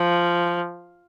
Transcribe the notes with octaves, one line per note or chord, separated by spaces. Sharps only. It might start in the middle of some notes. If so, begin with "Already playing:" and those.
Already playing: F3